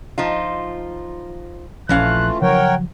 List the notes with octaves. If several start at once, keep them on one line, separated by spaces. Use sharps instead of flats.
F3 D#4 F4
A#1 E3 F3 A3 C#4 F4 F5 F#6
C#3 F3 F#3 A#4 C#5 F#5 G5